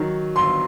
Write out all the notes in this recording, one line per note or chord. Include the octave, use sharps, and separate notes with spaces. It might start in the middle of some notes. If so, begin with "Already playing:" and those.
Already playing: D#3 F#3
G1 C6